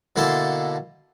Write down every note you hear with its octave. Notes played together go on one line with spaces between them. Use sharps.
B2 D3 A#3 E4 A5 C6